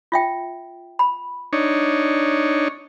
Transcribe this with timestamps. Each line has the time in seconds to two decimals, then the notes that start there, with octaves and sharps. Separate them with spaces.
0.12 F4 E5 G5
0.99 B5
1.53 D4 D#4 C#5